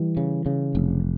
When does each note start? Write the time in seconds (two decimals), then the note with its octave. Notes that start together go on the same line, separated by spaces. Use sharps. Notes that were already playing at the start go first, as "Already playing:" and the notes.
Already playing: E3 G3
0.17 C#3
0.46 C#3
0.75 F1